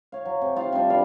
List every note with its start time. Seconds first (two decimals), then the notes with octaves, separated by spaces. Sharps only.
0.12 C#5 F5
0.25 F#3
0.42 C3
0.56 D#4 F4 F5
0.72 C3 G3 D4 F4
0.90 B4 D5 E5 F5